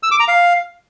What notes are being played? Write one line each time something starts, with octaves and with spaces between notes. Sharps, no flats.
E6
D6
A#5
F5